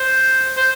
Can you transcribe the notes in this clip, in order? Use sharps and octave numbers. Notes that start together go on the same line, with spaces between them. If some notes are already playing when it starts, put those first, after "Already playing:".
Already playing: C5
C5